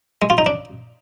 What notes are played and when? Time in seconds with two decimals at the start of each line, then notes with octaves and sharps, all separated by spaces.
0.22 G#3
0.30 F4
0.38 D#4
0.46 D4